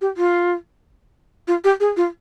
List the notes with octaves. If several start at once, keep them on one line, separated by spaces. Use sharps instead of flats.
G4
F4
F4
G4
G#4
F4